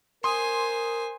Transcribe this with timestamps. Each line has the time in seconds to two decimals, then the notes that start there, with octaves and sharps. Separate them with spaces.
0.24 A#4 C5 G#5 C6 D#6